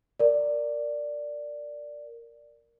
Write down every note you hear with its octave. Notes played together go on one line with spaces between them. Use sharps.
A#4 D5